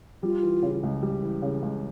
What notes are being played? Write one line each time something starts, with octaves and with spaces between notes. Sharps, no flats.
G3 F4
E3
C#3
C#2
G3
E3
C#3
C#2